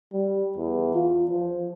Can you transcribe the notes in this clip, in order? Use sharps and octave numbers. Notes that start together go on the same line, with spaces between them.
G3
E2
F4
F3